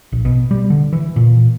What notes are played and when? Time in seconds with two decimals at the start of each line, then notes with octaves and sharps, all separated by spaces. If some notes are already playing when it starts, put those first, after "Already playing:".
0.12 A#1
0.25 B2
0.51 G3
0.70 D3
0.93 E3
1.16 A#2